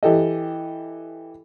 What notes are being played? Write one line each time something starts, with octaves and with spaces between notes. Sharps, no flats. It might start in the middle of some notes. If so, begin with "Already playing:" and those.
E3 G4 A4 D#5